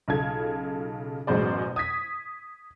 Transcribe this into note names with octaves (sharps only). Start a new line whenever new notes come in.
B1 C#3 F4 A4 G#6
A1 F#2 B2 G#3 C5 D5
D#6 G#6 B6